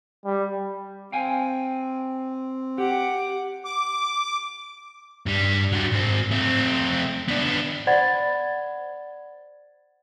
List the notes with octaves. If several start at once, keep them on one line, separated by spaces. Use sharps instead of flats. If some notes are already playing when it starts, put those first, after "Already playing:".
G3
C4 F5 G5 G#5
G4 F#5 D6
D6
G2 G3
F#3 D4
G#2 C4
A3 C4
B3 D4
C5 D5 F#5 B5 G#6 A6